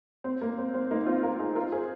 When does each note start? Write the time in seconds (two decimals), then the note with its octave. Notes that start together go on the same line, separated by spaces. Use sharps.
0.24 C4
0.41 A#3
0.58 C4
0.74 C4
0.91 A#3 D#4
1.06 C4 F4
1.23 F4 A#4
1.39 D#4 G#4
1.55 F4 A#4
1.72 G#4 C5